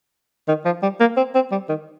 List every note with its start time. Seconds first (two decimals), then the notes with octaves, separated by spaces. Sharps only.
0.48 D#3
0.65 F3
0.83 G3
1.00 A#3
1.17 C4
1.35 C4
1.52 G3
1.69 D#3